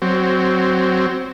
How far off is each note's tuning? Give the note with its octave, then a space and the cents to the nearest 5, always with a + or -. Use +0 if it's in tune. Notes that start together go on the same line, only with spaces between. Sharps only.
F#3 +10 C4 +0